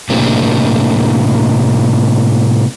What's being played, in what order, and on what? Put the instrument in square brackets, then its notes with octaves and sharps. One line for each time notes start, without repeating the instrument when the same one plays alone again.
[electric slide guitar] A2 C3 A#3 C4 D4 G4